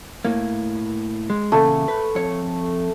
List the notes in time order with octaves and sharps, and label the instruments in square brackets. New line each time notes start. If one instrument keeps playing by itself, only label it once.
[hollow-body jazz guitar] A2 A#3
G#3
[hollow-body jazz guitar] E2 A#2 C#3 [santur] A3
[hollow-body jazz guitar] B4
F2 C#5